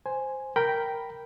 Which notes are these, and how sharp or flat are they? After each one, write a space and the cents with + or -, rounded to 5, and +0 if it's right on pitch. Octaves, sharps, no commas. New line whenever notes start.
C5 +0 G#5 +0
A#4 +0 G5 -5 B5 +0